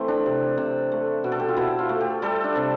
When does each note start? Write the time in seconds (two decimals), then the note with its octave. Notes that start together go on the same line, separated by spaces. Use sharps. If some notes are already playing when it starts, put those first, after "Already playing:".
Already playing: E3 A3 C4
0.08 D4
0.26 C3
0.57 C3
0.92 A3
1.24 B2
1.32 A4
1.39 G4
1.48 F4
1.56 B2 E4
1.79 F4
1.89 A3
2.01 G4
2.22 G3 A4
2.44 D4
2.56 C3